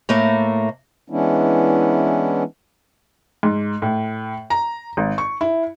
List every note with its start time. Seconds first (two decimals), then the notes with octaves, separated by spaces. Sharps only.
0.09 A2 A3 A#3
1.10 E3 G#3 B3 C#4 D4 E4
3.43 G#2
3.82 A2
4.50 A#5
4.97 G#1
5.18 C#6
5.41 E4